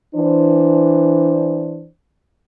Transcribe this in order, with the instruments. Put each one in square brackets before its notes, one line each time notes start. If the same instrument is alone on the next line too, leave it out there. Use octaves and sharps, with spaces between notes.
[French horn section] E3 D4 C5